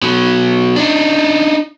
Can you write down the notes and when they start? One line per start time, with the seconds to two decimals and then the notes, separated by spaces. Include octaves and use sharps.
0.02 B2 F#3
0.76 D4 D#4